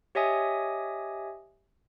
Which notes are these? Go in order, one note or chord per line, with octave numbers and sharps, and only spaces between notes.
G4 C#5 D#5 E5 G#5 D#6